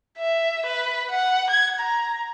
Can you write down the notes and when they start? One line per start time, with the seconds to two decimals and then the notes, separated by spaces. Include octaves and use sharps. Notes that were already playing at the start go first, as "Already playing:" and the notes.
0.18 E5
0.66 B4
1.10 F#5
1.51 G#6
1.80 A#5